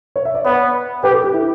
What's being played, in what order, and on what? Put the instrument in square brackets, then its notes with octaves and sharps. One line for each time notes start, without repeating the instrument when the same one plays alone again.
[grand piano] C#5
E5
D5
[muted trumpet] B3 [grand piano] C#5
[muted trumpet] G4 [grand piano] B4
[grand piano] A4
G4
E4